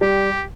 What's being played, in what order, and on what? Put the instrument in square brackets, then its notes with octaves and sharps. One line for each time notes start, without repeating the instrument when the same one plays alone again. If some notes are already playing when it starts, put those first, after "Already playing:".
[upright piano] G3 [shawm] G4